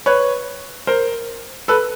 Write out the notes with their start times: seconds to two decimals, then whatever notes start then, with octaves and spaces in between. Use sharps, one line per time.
0.06 B4 C#5
0.87 A#4 C5
1.68 A4 B4